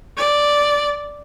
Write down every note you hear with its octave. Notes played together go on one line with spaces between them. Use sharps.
D5